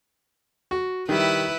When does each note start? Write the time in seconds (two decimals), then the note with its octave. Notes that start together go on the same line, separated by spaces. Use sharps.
0.71 F#4
1.09 D#3 G3 E4 B4